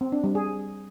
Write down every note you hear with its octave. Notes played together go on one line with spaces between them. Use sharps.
C4
D4
G3
G#4